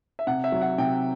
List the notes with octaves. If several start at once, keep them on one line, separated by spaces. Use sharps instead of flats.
E5
C3 F#5
E5
F#3
F#5
C3 G5